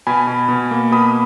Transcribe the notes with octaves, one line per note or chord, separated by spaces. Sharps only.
B2 G#5 B5
B2
B2
A#3
B2 B5 D#6